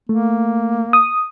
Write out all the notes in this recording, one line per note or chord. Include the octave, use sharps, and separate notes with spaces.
A3 A#3
D#6